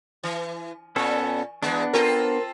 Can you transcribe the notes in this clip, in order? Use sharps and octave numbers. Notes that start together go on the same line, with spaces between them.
E3
A#2 B3 C#4 A4
E2 G#3 B3 D4
C4 F4 A4 A#4